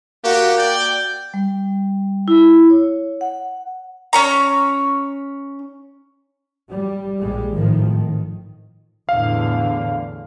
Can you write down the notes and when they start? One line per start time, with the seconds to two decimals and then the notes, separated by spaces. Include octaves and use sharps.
0.24 A#3 F#4 G4
0.58 D5 G5 G6
1.34 G3
2.28 E4
2.70 C#5
3.21 F#5
4.13 C#4 C#5 A#5
6.70 G3
7.21 A#1 G3 G#3
7.54 G#1 A2 D#3 F3
7.89 D#3
9.09 E2 A2 D3 F5